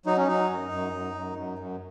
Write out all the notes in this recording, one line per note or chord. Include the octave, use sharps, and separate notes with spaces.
F#3 D#4
C#4
F#3 D#4
F#2
F#2
F#2
F#2
F#2
F#2